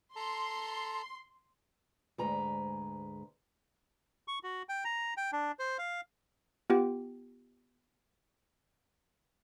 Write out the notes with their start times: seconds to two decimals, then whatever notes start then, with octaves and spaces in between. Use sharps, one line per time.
0.16 A4 A5 A#5 C6
2.18 D2 G#2 G#3 B4 A#5
4.28 C#6
4.43 F#4
4.69 G5
4.85 A#5
5.17 G5
5.33 D4
5.59 C5
5.78 F5
6.70 B3 F4 G4 G5